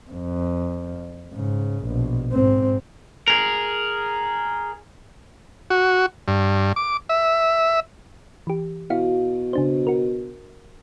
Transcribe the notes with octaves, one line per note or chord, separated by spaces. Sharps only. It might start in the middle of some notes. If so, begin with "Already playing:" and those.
F2
G#2 C#3
A#1 B2
G#2 C4
G#4 A#4
F#4
G2
D6
E5
E3 G4
B2 E4 F#4 F5
C#3 D4 C5
F#4 A#4